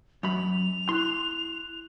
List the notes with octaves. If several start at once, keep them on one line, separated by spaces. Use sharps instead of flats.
F#2 B5 F7
E4 C6 F#6